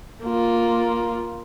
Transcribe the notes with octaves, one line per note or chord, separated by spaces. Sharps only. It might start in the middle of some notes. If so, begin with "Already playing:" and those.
A#3 F4